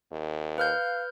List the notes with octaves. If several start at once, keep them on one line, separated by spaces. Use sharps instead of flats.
D#2
B4 F5 F6 G6